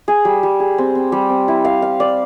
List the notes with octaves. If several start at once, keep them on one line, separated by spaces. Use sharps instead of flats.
G#4
G3
G3
G#4
C4
C4
G3
C4
E4
F5
F5
D5